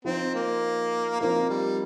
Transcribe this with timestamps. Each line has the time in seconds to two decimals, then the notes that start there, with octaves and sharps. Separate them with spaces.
0.05 F3 C4 D#4 C5
0.34 A#3
1.20 F3 A#3 C4 D#4 A#4
1.49 G3